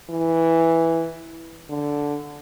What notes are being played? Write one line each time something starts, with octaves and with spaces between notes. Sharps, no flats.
E3
D3